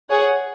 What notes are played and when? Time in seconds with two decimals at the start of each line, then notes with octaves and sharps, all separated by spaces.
0.10 G#4 C#5 F#5